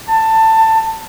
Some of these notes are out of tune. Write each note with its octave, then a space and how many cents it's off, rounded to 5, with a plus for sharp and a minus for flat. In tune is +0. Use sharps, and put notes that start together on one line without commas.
A5 +20